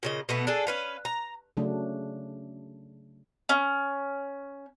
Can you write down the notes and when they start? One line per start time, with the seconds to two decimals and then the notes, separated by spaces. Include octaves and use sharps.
0.03 A#2 C#3 D#5
0.29 B2 A3 B3
0.47 D4 G#4 A4
0.67 C#4 B4 F5
1.05 A#5
1.57 C#3 F#3 A3 D4
3.49 C#4